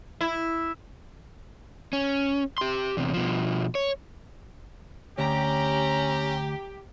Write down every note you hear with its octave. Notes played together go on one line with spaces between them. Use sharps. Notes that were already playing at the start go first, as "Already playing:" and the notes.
E4
C#4
G4 C6
E2 C3
B2 F3
C#5
D2 C#4 G4 A#5